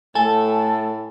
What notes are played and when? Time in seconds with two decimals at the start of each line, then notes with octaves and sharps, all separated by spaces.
0.15 A2 A3 A4 G#5